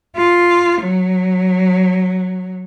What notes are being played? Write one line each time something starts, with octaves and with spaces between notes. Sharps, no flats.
F4
F#3